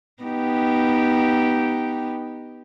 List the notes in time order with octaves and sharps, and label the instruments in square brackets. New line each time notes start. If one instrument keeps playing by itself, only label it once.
[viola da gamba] B3 D#4 G4